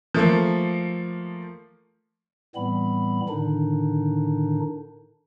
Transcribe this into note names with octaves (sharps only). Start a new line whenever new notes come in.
F3 A3 A#3
A2 E3 G3 B3 C4 B5
A2 D3 D#3 D4 D#4